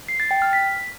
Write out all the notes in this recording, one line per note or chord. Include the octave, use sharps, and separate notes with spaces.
C7
A6
G5
F6
B6